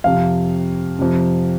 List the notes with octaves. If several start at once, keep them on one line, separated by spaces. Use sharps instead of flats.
F2 C3 F5
F2 C3